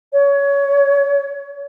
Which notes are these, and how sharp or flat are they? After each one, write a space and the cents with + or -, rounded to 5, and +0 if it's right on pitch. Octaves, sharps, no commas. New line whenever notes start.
C#5 +20